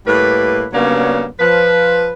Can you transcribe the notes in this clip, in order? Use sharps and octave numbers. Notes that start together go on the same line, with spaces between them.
A2 G3 A#3 B4
C#3 F#3 G3 A#3 B3 D4
F3 B4